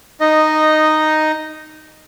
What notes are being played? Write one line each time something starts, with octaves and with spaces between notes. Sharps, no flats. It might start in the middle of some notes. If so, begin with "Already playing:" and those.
D#4 D#5